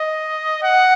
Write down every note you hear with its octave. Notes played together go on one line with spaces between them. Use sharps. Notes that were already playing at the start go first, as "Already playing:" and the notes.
Already playing: D#5
F#5